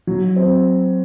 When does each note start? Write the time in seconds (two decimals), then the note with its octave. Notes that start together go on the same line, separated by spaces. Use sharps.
0.07 F#3
0.36 C4